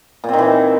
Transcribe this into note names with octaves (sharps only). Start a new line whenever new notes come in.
A#2 D#3 E3 C4